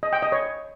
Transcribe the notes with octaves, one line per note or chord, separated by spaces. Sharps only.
D#5
G5
D#5
C#5